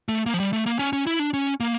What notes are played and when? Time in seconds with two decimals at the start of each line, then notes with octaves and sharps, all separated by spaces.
0.09 A3
0.26 A#3
0.34 F3
0.40 G3
0.53 A3
0.66 A#3
0.79 C#4
0.93 C#4
1.07 E4
1.19 D4
1.34 C#4
1.60 A#3